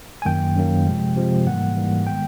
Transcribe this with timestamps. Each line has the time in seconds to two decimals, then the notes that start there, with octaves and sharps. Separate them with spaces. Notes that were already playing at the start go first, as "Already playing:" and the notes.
0.22 G#5
0.25 F#2 D#3 F#3 A#3 G5
0.56 F#2 D#3 F#3 A#3
0.87 C3 F3 G#3
1.16 C3 F3 G#3
1.46 G#2 E3 G3 A#3 F#5
1.76 G#2 E3 G3 A#3
2.07 D#3 G#3 B3 G5